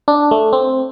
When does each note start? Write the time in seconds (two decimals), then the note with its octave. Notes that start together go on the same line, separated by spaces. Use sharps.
0.08 D4
0.31 A3
0.53 C4